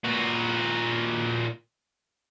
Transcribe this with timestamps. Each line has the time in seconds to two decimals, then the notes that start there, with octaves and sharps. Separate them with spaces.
0.04 A#2 F#4